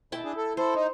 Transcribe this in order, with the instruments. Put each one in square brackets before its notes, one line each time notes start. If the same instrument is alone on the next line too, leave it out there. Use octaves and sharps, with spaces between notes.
[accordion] B2 [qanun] E4 G5 A5
[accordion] D4 G#4
A4
[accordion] E4 A4 [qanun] C5
[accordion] D#4